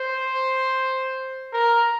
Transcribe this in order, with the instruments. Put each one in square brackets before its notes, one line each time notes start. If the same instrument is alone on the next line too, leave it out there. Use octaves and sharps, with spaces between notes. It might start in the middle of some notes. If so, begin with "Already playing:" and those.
Already playing: [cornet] C5
A#4